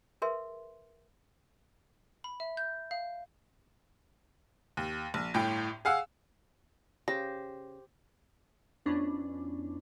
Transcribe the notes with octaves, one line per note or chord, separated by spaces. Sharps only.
G#4 A#4 B4 E5 C6
B5
E5
G6
F5
D#2
A#1
G1 A2 G5
G#4 F5 F#5 E6
C#3 G4 C5 A#6
F2 B3 C#4 D4 E4